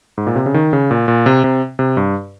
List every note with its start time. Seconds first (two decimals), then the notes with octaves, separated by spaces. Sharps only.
0.18 G#2
0.27 A#2
0.36 C3
0.46 C#3
0.54 D#3
0.73 C#3
0.91 A#2
1.08 A#2
1.26 C3
1.44 C3
1.79 C3
1.97 G2